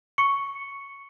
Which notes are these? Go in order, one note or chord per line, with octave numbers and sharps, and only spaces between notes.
C#6 C#7